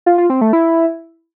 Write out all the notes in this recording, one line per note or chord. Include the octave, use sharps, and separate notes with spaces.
F4
F4
C4
A3
E4